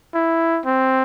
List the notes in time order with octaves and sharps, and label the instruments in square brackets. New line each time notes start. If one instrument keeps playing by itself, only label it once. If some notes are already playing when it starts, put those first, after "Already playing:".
[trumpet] E4
C4